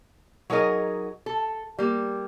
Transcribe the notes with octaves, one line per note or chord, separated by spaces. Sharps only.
F#3 D#4 G#4 A#4 D#5
A4
G3 A#3